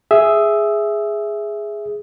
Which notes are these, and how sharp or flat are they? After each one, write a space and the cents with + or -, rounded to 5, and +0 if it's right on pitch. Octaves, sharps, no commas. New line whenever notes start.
G#4 +0 E5 +0 D#6 +0